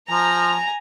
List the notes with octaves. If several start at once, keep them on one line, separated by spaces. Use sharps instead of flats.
F3 G#5 A#5